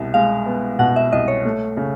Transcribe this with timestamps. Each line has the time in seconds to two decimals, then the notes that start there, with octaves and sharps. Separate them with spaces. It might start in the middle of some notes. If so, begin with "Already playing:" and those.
Already playing: C2 B2
0.14 G#3 F5
0.46 B3
0.79 B2 F#5
0.96 E5
1.12 C2 D#5
1.28 C#5
1.45 A3
1.77 C#3